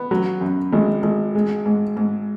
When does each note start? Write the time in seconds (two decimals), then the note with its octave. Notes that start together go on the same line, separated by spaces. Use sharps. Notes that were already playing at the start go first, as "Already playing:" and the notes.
Already playing: B3
0.11 F#3
0.41 F#2
0.73 G#1
1.03 G#1
1.35 G#3
1.66 G#2
1.97 G#2